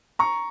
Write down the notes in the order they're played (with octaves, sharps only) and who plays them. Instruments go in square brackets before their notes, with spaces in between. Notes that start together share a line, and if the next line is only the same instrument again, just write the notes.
[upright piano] A#5 C#6